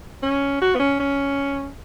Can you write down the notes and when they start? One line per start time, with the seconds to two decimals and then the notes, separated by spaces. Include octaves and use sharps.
0.23 C#4
0.61 F#4
0.75 B3
0.80 C#4
1.00 C#4